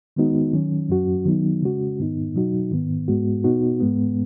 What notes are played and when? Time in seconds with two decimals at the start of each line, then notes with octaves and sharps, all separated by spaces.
0.16 D#3 G#3 B3 D#4 F#4
0.53 D#3 F#3 C#4
0.89 F#2 F#3 C#4 F#4
1.25 D#3 F#3 B3 D#4
1.62 C#3 G#3 C#4 F#4
1.99 G#2 D#3 B3 D#4
2.35 B2 F#3 D#4 F#4
2.71 G#2 D#3 B3
3.08 G#2 G#3 B3 F#4
3.44 B2 B3 D#4 F#4
3.80 G#2 G#3 B3